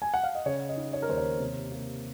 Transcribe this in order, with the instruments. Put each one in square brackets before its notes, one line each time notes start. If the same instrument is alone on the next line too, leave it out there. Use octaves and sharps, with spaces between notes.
[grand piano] G#5
F#5
F5
D#5
C#3 C#5
D#5
D#4
C#5
A#4
D#2 C5
C#5
C3
A#3